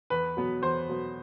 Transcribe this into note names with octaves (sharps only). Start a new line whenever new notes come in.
E2 B4
B2 F#3 B3
E2 C5
B2 F#3 B3